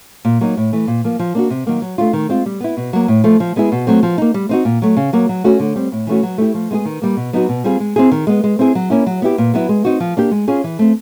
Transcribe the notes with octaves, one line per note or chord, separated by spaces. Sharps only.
A#2
F#3 A#3 D#4
A2
E3 A3
A#2
F3 A#3
F3
A#3 D4 F#4
C3
D#3 F#3 A#3
F#3
A3 D4 F4
D#3
G#3 C4 F4
G3
B3 E4
B2
F#3 A#3
A2
F3 A3
F3
G#3 B3 E4 G#4
B2
F#3 A3 C4
F3
A#3 D#4
G3
C4 D#4 F#4
A#2
F#3 A3
C#3
F#3 A#3
F#3
A3 C#4 F#4
D3
G3 C4
A2
E3 A3 C#4 F#4
F#3
A3 C#4 E4 G4
F3
G#3 B3 E4 G#4
D#3
G3 A#3
B2
F#3 B3 D#4 F#4
B2
G3 C4 F4 G#4
G#3
C4 E4 G#4
D#3
G#3 B3
G#3
C4 E4 G#4
F#3
A#3 C#4 E4
F#3
B3 E4 G4
A#2
F#3 B3 E4
G#3
C4 D#4 F#4
F3
A#3 D4 G4
G#3
C#4 F4 G#4
E3
A3 C4